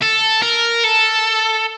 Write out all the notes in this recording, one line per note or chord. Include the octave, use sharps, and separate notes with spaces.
A4
A#4
A4